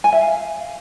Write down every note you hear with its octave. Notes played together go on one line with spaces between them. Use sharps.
G#5
E5
F5